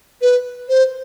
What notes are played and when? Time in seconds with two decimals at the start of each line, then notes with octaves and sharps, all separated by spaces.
0.22 B4
0.69 C5